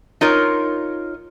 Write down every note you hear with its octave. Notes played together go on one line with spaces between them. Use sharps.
D#4 F4 A#4 C#5